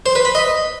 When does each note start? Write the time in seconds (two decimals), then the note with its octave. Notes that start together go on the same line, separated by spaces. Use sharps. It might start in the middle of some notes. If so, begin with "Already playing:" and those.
0.06 C5
0.15 B4
0.25 B5
0.35 D#5